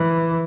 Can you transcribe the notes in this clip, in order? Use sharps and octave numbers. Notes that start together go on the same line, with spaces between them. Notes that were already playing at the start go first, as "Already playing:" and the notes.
Already playing: E3